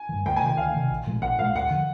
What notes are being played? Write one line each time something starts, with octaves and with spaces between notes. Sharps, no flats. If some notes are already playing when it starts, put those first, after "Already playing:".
Already playing: G#5
E3
G2
D2 G5
G#5
C3 D#3 G5
D2 F5
C3 D#3
A#1
A#2 F3 G#3
A#1 F#5
A#2 F3 G#3 F5
D#2 F#5
D3 F3